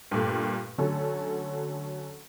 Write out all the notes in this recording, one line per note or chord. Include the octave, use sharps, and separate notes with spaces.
G2 A#2 A3
D3 F#3 A3 C#4 A4